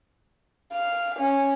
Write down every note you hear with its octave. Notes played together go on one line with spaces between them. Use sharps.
F5
C#4